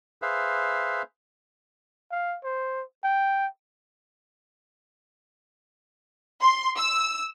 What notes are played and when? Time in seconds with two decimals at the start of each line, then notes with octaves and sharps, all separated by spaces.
0.22 G#4 B4 C5 E5 F5
2.11 F5
2.44 C5
3.04 G5
6.42 C6
6.76 E6